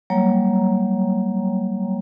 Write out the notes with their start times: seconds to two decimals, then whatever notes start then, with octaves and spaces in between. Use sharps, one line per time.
0.10 F#3 G3 A#3 C#5 G5 A#5